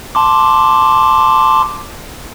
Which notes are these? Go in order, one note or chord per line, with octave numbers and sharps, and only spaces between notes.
A5 C6 D6